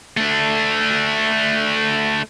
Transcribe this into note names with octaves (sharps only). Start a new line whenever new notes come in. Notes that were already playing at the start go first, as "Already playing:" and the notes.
A3 D4